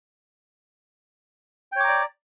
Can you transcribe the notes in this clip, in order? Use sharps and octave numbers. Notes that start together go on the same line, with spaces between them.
C#5 D5 G5 A#5 D6